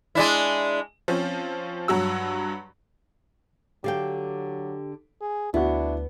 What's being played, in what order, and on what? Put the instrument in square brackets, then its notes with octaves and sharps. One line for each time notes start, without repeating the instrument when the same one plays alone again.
[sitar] G#3 D4 E4
[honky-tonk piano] F3 C4 C#4
G2 F#3 F#4 E6
[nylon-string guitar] D3 F5 G5 [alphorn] F#3 [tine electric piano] G4
[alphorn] G#4
[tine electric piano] D2 [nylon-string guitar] B3 [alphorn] D4 [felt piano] E4 F#4